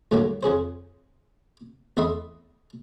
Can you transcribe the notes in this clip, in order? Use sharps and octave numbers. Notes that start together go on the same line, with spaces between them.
A2 D3 F#3 G3 A3 A#3
F2 C#4 G#4 C5
E2 A3 D#5 E5 B5 C6